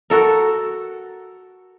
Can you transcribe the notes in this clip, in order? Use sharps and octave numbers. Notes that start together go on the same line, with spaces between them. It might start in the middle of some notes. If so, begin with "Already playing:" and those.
F#4 A4 A#4